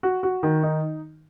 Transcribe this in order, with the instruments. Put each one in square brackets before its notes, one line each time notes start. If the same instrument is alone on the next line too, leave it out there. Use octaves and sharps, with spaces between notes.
[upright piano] F#4
F#4
D#3
D#4